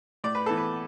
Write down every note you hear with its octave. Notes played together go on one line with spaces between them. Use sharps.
A2 D5
B4
E3 B3 A4
B4